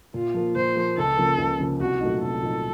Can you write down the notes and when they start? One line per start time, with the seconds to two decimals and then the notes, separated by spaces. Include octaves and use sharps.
0.14 A#2 F4
0.34 F3 A#3
0.56 A#2 C5
0.76 F3 A#3
0.97 C#2 A4
1.18 C#3 F3 A#3
1.38 C#2
1.60 C#3 F3 A#3
1.80 C2 F#4
2.00 A#2 F#3 A3 D#4
2.22 C2 A4
2.43 A#2 F#3 A3 D#4